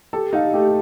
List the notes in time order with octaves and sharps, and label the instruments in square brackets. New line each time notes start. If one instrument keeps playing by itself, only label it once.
[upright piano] G4 [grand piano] A4
[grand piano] D#4 [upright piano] F5
[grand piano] A3 [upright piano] G4